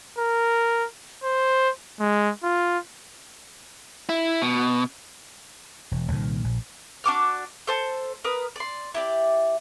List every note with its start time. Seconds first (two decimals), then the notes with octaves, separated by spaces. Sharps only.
0.19 A#4
1.24 C5
2.00 G#3
2.43 F4
4.09 E4
4.42 B2
5.91 E1
6.12 C2 A#2 D#3
6.44 A#1
7.04 D4 F#4 D6 F6
7.67 A4 C5 A5
8.24 A#4 B4 D#6
8.56 D5 C6
8.95 E4 G4 D5